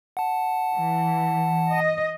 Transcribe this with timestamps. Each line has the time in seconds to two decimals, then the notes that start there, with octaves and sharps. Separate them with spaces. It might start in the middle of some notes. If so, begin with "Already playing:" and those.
0.17 F#5 A5
0.76 E3
1.70 D#5